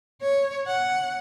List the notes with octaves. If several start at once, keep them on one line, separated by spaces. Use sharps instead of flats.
C#5
F#5